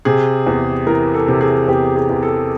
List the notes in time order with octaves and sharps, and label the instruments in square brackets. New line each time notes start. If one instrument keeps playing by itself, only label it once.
[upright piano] C3 G#4
E2
E3 A#4
A4
C3
G#4
E2 G4
G#4
E2
A4